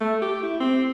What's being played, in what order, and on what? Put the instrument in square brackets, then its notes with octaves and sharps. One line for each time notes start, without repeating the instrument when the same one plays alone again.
[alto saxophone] A3
G4
E4
C4